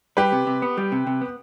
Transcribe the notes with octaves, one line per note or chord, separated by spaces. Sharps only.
G3 G4 B4
C3
C3
B3
G3
C3
C3
B3